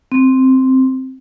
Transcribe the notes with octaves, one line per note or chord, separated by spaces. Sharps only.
C4